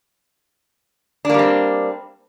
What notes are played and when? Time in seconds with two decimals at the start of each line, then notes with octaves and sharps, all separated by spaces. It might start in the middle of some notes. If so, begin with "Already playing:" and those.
1.25 D4
1.29 A#3
1.34 G3
1.39 C4